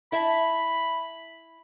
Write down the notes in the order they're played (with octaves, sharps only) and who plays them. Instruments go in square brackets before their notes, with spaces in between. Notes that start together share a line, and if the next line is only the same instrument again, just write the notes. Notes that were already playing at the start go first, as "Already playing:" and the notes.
[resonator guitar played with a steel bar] E4 E5 A5 [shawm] B5